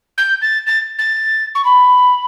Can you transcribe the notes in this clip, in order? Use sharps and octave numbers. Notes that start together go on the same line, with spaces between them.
G6
A6
A6
A6
C#6
B5